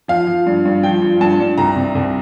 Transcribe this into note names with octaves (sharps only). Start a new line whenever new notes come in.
F3 F5
F3
G2
G2
F3 G5
F3
G2 A5
G2
C2 A#5
C3
C2